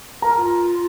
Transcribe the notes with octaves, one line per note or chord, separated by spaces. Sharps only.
A#4 A#5
F4